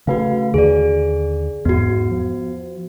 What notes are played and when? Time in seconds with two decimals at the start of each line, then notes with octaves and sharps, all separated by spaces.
0.07 C#3 A3 F#4 B4 F5
0.54 D#2 D3 G#4 D5
1.65 E2 G#2 B3 F#4
2.11 F3